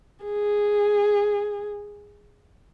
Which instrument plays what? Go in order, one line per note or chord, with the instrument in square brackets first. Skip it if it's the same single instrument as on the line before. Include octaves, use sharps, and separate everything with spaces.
[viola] G#4